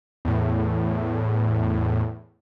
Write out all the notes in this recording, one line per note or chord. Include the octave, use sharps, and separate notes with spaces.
E2 A2